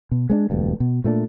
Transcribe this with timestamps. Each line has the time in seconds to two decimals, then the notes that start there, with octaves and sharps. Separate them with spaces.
0.11 B2
0.30 G#3 B3 D4
0.50 E1 D2 G2
0.80 B2
1.04 A#2 A3 B3 D4